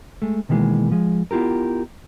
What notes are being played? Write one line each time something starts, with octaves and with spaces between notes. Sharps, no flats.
G#3 A3
B2 D#3 E3 G3 G#3 A#3
F3 G#3
B3 E4 F4 G4 A#4